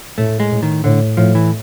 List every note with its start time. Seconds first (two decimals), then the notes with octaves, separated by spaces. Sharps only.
0.18 A2 A3
0.40 G#3
0.51 A2
0.63 D#3
0.84 A2 D3
1.17 A2 F3
1.35 E3